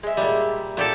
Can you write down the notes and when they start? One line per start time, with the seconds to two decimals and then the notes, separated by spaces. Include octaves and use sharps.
0.03 G#3 E5
0.17 A#2 G3
0.77 A#2 F3 B3 G4 A4